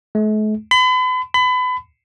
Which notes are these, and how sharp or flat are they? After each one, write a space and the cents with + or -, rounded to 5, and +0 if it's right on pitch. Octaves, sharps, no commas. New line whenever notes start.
A3 -45
B5 +40
B5 +30